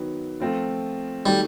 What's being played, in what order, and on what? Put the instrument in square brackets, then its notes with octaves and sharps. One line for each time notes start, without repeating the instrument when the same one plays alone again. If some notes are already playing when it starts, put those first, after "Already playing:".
Already playing: [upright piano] D#3 F#3 B3
F3 A3 C4 F4
[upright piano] D#3 F#3 A3 [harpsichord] G3